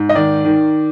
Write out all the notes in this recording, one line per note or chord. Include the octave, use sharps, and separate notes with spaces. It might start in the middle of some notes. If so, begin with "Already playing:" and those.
Already playing: G#2
D#5
D#3 D5
D#3